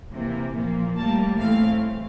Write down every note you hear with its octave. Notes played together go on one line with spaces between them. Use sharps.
C3 E3 A#3
A#2 F3 A#3
A2 G3 A#3 A5
A2 E3 A3 C4 F5